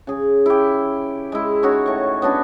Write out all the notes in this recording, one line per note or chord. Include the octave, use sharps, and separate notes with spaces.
C#3 G#4
E4 G4
G#3 E4
C#4 D#4 F#4 C#5
A2 C#6
B3 C#4 D4 F#4